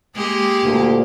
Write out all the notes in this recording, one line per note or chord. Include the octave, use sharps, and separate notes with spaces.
G#3 A#3 G4
D2 A#2